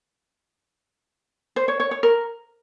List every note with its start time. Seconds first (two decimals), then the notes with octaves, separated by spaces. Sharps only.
1.56 C5
1.68 C#5
1.80 C#5
1.91 C#5
2.03 A#4